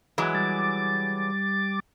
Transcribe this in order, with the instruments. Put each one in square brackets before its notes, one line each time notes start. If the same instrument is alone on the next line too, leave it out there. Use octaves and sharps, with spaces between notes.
[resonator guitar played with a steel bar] E3 F#3 G#3
[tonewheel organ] G3 D6 A6